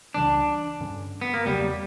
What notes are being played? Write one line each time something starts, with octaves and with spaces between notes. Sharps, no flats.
C#2 C#3 E3 G3 D4
G2 D3 G3 C#4
B3
A#3
E2 C#3 F#3 G3 B3